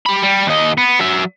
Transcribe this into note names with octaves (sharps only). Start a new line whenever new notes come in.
G4 B5
G3
D#2 D#5
B3
F#3 E5